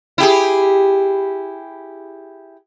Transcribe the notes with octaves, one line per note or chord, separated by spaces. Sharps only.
E4 G4 G#4